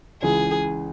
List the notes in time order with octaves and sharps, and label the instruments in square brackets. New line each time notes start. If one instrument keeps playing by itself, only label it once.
[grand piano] C#2 C#3 E3 [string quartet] G#4